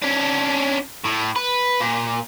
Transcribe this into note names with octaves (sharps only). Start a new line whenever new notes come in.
C#4 D4
A2
B4
A#2